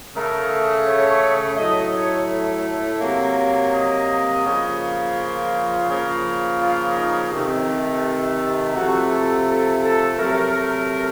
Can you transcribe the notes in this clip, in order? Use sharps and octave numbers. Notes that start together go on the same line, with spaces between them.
C#3 A3 A#4
C#5
A2 F#3 A3 D#5
C#5
C3 F#3 A#3
D#5
C#3 F3 A#3
F4
C#3 F3 A#3
F4
D#4
C3 D#3 A3
C3 F3 A3 F#4
A4
A4
A4
C3 F#3 A3 A#4